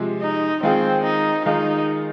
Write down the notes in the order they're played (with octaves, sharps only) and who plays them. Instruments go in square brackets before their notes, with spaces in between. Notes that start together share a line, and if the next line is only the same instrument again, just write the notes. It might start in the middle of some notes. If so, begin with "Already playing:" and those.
Already playing: [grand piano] C3 F3 G#3
[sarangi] D#4
[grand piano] D#3 G#3 F4 G#4 [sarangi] C4
[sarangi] D#4
[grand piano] D#3 G#3 F4 G#4 [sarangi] D#4